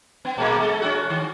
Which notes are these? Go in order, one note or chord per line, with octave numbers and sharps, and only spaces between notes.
B3
A#2 G#3 A#3
G#3 A4
C#4 F#4
D#3